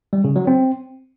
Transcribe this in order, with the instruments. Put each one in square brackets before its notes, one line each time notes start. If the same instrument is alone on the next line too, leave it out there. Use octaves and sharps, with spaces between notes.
[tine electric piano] G3
C#3
F#3
C4